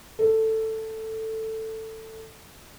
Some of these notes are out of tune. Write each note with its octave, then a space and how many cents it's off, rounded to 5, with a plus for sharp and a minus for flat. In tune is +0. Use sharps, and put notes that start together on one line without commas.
A4 +10